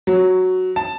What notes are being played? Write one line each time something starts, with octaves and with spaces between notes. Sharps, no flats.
F#3
A5